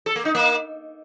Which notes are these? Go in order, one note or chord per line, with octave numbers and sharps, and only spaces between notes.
A4
A#3
D#4
A#3